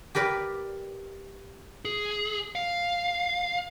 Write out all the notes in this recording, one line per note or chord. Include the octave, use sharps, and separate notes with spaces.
G4 A#4 B4 D5
G#4
F5